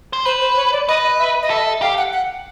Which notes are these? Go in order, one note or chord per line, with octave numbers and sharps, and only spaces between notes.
C5
B4 C5
C5
C#5
D5
B4 D#5
E5
D#5
A4 E5
G4 F5
F#5
F#5